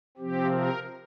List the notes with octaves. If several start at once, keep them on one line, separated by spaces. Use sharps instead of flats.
C3 F3 C4 G4
A#4